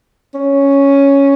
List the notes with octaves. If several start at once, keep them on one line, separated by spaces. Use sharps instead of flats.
C#4